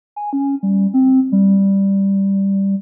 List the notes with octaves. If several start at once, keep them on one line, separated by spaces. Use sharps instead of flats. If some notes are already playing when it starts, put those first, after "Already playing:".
G#5
C#4
G3
C4
G3